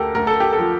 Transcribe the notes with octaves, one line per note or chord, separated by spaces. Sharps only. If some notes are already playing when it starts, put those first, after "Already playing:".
Already playing: D2 G4 A4 A#4
D2 A#4
A4
G4
A4
F3